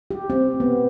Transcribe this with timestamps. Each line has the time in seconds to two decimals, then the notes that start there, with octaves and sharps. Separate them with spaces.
0.11 G4
0.30 C4
0.60 B3